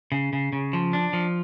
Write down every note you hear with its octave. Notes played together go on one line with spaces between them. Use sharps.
C#3
C#3
C#3
F3
D4
F3